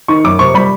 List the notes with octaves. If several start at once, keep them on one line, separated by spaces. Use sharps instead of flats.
D#3 C#6
F#2 D6
C3 C#6
G3 B5